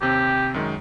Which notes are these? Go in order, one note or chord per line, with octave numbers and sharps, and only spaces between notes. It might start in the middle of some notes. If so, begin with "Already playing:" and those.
D#2 C3 C4 G4
F#2 D#3 G#3